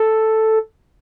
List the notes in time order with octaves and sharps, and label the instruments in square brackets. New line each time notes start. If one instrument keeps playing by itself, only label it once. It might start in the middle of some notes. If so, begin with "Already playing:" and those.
Already playing: [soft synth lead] A4